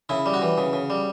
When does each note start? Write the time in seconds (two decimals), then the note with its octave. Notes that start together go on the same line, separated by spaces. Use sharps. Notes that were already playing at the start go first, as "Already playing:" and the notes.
0.09 C#3 E4
0.26 G3
0.34 F#4
0.42 E3
0.58 C#3
0.73 C#3
0.90 G3